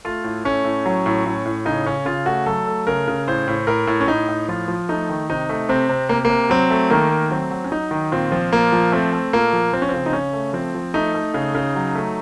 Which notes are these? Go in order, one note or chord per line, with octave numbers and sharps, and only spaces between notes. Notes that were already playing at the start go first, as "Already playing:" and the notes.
A3 F4
A2
A3 C#4
A2
F#3
A2
A2
A2
C#3 D#4
C#3 C#4
C#3 F4
A3 F#4
F#3 A4
A3
C#3 A#4
C#3
A2 C5
A2
A2 A#4
A2
C#4
A2 D#4
A2
F3 F4
F3
A3 D#4
D#3
C3 D#4
A3
C3 C4
C3
C3 A#3
C3 A#3
F#3 C4
A3
D#3 A#3
A3
F#3 C4
F#3
C#4
F#3 D#4
D#3
A#2 C4
F3
A#2 A#3
F3
A3 C4
A3
A#2 A#3
F3
F3 C4
C#4
C4
C#3
D#4
C#3 C#4
A3
F3 C4
F3
A3 D#4
A3
C#3
C#3
F#3
A3